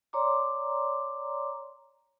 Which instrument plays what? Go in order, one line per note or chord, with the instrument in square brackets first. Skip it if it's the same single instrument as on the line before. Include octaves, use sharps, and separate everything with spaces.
[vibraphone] C#5 D5 A#5 C6 D6